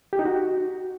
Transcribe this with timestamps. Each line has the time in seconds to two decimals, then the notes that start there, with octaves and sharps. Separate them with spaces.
0.13 G4
0.19 D#4
0.25 F#4